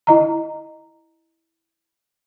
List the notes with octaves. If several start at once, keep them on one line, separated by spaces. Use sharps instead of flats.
E4 D#5 A#5